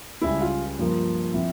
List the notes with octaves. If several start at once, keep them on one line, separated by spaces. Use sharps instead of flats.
C#2 C#3 G3 E4
F4
G2 F3 A#3 F4
F3 C4 E4